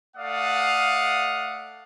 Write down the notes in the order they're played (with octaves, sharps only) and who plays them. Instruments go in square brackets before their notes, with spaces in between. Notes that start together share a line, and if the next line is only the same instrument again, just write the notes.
[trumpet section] A3 D5 F5 F#5 D#6